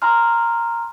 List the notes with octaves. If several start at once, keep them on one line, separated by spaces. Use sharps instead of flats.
G#5 A#5 C6 F6